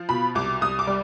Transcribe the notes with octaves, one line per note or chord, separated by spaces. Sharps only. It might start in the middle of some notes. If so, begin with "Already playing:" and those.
Already playing: F3
B2 B5
C2 D6
C2 D#6
D6
G3